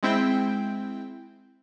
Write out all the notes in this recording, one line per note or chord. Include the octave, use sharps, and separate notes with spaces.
G#3 C4 E4 G5